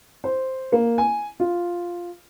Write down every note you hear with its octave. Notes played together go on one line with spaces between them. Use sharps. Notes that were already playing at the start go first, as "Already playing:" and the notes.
C5
A#3
G#5
F4